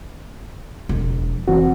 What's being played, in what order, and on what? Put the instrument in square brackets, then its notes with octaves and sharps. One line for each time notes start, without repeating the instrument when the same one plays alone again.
[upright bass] E1 F3
[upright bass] F1 [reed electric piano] E3 C4 F#4